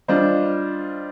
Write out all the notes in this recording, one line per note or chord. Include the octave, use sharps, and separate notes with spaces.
G3 D4 F4 C5 D#5